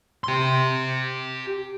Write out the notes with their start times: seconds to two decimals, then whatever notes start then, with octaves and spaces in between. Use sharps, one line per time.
0.24 G4 C6